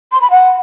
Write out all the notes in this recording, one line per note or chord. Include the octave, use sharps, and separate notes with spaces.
C6
B5
F#5